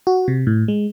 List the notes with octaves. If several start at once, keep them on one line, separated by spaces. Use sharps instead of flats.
F#4
C3
A2
G#3